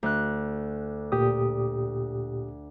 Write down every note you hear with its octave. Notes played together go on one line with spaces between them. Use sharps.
D2 F#6
A#2 G4 D#6